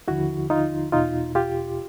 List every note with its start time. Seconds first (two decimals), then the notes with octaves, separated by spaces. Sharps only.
0.08 D#2 D3 F3 E4 F#4
0.50 D#4 F4
0.92 E2 B2 D#4 F4
1.35 F4 G4